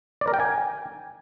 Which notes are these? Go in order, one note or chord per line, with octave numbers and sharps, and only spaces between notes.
D5
A#4
G5
G#5